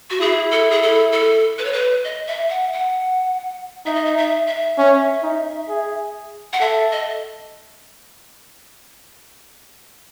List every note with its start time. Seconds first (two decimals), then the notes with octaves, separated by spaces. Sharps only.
0.10 F#4
0.21 E4 G#4
0.51 A4
0.71 G#4
0.82 A4
1.12 A4
1.58 B4
1.65 C#5
1.73 B4
2.04 D#5
2.27 E5
2.49 F#5
2.73 F#5
3.86 D#4 E5
3.95 D#5
4.05 E5
4.17 E5
4.47 E5
4.78 C#4
5.23 D#4
5.69 G#4
6.53 F#5
6.60 A4 E5
6.92 D#5